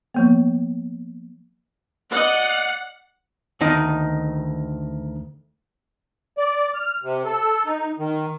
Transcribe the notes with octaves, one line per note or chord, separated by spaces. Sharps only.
F3 A#3 B3
D5 D#5 F#5
D2 D#3 D#4
D5
F6
C3
A4
D#4
D#3